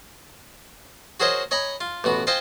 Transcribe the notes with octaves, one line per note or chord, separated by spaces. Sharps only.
F#4 G#4 A#4 C5 C#5 D#5
C#5 D#5 G#5 A#5 B5
F4
A1 B2 F#4
F4 C5 D#5 G5 G#5